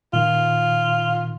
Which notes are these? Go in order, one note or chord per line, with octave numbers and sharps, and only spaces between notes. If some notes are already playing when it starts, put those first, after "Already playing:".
A#2 D#3 F4